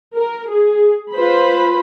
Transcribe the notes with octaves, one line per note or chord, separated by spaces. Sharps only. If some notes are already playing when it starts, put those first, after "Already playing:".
A#4
G#4
F4 B4 C5 B5